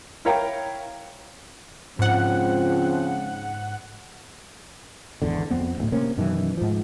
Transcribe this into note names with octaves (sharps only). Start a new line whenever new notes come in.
E4 A#4 C#5 F5 G5 A#5
G#2 C#3 F3 C4 F#5
G#1 E2 D3
F2 B3 C4
D1 D2 A2
C3 A#3 C4 C#4
F#2 B2 D#3 E3
G#2 F3